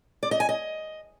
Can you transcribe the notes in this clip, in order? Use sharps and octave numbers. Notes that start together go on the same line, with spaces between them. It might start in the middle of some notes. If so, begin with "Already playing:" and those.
D5
D#5
G#5
D#5